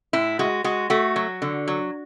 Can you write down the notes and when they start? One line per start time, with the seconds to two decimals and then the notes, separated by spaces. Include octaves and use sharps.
0.13 A2 E4
0.39 G#3 F#4
0.64 G#3 F#4
0.90 A3 F#4
1.16 F#3
1.42 D3
1.68 F#3